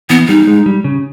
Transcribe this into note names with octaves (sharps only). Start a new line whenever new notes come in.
E3 B3
G3 D#4
G#3
G3
C#3